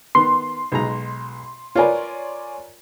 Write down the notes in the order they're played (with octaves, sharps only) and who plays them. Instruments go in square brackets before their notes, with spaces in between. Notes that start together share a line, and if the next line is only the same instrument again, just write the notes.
[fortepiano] D#3 B3 [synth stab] C6
[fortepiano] B1 G#3 A#5
[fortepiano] F4 A#4 B4 [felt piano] C#5 D5 G#5